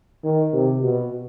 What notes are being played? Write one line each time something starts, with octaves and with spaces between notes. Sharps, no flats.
D#3
C3
B2